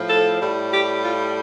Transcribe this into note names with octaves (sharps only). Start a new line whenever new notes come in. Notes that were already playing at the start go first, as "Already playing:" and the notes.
Already playing: A2 F3 A3
A4
A2 G3
G4
F4